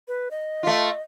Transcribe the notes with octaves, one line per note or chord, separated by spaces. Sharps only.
B4
D#5
A3 F4